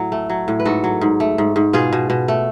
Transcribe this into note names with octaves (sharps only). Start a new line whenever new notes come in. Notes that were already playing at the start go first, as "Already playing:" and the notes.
Already playing: A2 F#3 F#4
A3
F#3
A2
B4
G#2 F#4 A4
F#3
G#2
A3
G#2
G#2
B2 F4 G#4
B2
B2
A3